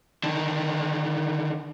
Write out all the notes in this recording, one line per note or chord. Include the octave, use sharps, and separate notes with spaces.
D3 D#3